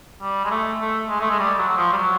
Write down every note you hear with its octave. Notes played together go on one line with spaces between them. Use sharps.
G3
G#3
A3
A3
G#3
A3
G#3
G3
F#3
F#3
F3
G3
F#3